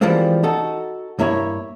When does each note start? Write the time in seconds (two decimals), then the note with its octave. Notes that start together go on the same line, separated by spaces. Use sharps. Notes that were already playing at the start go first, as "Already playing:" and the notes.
0.01 E3 F3 G3 G#3 A#3 C4
0.43 D#4 F#4 A4
1.19 G2 A#3 E4 C#5